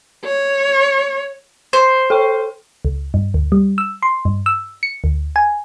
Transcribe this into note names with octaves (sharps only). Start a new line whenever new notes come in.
C#5
C5
A4 G5 C#6
C#2
G2
D2
G3
E6
C6
G2
E6
C#7
D2
G#5